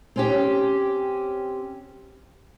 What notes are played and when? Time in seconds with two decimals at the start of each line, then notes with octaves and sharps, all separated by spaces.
0.16 C4 C#4 G4